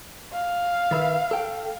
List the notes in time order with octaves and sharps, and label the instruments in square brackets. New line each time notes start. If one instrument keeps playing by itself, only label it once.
[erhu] F5
[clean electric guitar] D#3 B4 E5
A4 G5